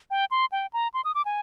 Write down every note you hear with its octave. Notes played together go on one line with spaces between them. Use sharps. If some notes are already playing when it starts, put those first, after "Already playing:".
G5
C6
G5
A#5
C6
D#6
D6
G#5